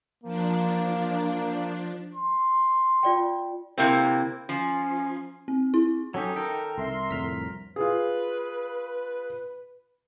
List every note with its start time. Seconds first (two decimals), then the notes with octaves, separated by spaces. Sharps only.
0.24 F3 A#3 D4
2.15 C6
3.03 F4 D5 G5
3.78 C3 A#3 C4 E4
4.49 F3 C#4
5.48 C4
5.74 E4
6.14 F#3 C#4 D#4 G4 A4
6.36 D#3 A4 A#4 G5
6.78 C2 E5 C6
7.11 C2 F2 A2 D3 F6 B6
7.76 F4 G#4 B4